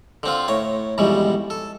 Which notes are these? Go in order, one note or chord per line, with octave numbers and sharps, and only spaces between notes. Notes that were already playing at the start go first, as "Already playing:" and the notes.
D3 C4 F4
A2 C#5 A#5
F2 G#2 B2 E3 G3
A4